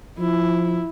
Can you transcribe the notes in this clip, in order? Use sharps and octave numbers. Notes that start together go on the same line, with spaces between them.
F3 E4